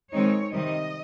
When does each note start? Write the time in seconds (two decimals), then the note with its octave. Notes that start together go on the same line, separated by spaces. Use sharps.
0.12 D#3 G#3 C4 D#4 C#5
0.53 C3 D#3 G3 D#5